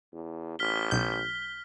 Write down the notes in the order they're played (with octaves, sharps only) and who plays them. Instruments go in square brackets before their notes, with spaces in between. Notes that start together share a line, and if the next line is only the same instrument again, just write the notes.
[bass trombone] E2
[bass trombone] A1 [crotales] F6 B6 G7
[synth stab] B1 G6